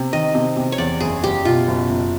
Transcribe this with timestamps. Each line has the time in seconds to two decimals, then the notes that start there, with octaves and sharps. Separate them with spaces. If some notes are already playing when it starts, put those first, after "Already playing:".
Already playing: C3
0.12 D#3 D#5
0.35 C3
0.57 C3
0.72 C#5
0.78 E2 D5
1.00 F#1 G#4
1.24 F#1 G4
1.45 B2 F4
1.68 F#1
1.90 F#1